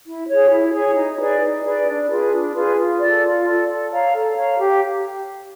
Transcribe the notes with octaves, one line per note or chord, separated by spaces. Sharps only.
E4
G#4 C#5
E4
G#4 C#5
D#4
G#4 B4 D5
D#4
G#4 B4 D5
D4
F4 G#4 B4
D4
F4 G#4 B4
F4
D5
A4
F4
A4 D5
A4
C#5 F5 A#5
A4
C#5 F5 A#5
G4